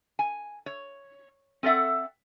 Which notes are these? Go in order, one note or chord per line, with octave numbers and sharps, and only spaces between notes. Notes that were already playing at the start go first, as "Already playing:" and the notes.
G#5
C#5
C4 A4 D5 E5 F#5